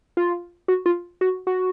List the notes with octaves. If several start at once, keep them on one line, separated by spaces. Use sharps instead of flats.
F4
F#4
F4
F#4
F#4